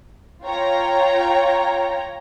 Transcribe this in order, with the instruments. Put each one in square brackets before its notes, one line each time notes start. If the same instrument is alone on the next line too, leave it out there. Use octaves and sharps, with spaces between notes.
[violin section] F4 C#5 G5 A#5